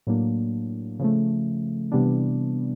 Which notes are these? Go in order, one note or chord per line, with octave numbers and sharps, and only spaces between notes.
A2 F#3 A#3 D4
C#3 F3 A3
C3 E3 G3 B3 D4